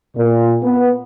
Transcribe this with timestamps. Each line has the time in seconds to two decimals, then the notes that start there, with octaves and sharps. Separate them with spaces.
0.17 A#2
0.63 B3